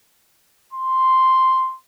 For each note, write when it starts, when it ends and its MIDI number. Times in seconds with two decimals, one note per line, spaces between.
0.73 1.76 84